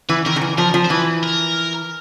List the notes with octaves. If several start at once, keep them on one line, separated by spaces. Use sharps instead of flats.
E3 B4
D#3 A#4
D#3
E3
F3 A#4
F3
C5
E3 B4
A#4